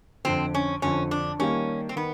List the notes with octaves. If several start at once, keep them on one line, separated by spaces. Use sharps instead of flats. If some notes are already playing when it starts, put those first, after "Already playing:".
F2 D3 F3 C4
C#4
F2 D3 F3 C#4
D4
D#3 G3 A#3 C#4
C4
D#3 B3